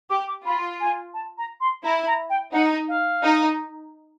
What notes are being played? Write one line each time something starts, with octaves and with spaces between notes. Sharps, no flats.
G4 D6
D6
F4 B5
G#5
A5
A#5
C6
E4 A#5
A#5
G5
D#4 F#5
F5
D#4